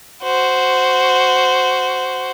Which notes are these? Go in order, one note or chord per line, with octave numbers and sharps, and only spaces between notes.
F#4 C5